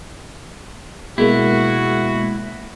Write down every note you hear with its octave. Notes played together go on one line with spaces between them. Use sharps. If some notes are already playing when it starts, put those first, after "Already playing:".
B2 G#3 A#3 E4 F#4